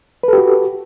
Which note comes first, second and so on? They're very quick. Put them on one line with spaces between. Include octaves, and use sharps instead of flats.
B4 A4 G4 F#4